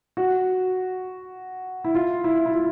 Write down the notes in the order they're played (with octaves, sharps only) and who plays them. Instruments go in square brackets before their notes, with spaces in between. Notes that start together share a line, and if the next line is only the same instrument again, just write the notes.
[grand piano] F#4
E4
F4
E4
E4
F4